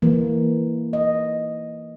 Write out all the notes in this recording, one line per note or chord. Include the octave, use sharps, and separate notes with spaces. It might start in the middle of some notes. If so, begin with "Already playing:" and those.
E3 A#3
D#5